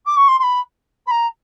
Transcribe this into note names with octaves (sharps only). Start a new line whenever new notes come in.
D6
C#6
C6
C6
B5
B5
A#5